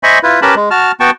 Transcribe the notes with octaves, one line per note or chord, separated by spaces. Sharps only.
C5 D#5 E5 G#5 B5 C#6
E4 F4 B4
C#4 G4 A#4 B4 A5 B5
G#3
F#4 A5 F6
B3 F#4 G5 A5 C#6